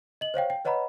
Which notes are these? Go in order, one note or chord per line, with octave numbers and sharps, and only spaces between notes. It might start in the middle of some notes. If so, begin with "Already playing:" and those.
D#5 F#7
C5 C#5 F5 G5
G5
B4 C#5 D#5 F#5 A#5 B5